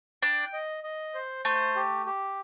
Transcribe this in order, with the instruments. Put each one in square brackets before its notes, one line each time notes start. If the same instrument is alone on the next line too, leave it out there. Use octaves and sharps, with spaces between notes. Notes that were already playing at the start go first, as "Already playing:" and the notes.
[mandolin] D4 [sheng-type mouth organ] G5
[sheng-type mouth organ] D#5
D#5
C5
[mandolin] A3 [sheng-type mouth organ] C5
[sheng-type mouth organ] G4
G4